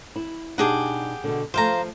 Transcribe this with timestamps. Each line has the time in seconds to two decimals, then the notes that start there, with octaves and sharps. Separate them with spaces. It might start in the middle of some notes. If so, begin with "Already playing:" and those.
0.16 E4
0.58 B2 D4 D#4 G4 G#4 F#5
1.24 B2 D3
1.54 F3 A3 C5 F5 A#5